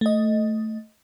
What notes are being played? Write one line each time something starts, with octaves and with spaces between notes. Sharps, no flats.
A3 D#5